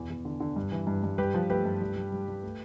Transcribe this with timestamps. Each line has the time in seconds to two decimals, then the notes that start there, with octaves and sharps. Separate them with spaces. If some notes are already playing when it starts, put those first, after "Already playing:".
Already playing: E2 B2
0.10 E2
0.25 D3
0.40 D3
0.56 G2
0.72 E3
0.87 G2
1.04 G2
1.18 G2 G4 B4
1.34 F3
1.50 A3 G4 B4
1.65 G2
1.82 G3
1.96 G3
2.12 G3
2.28 G3
2.43 A3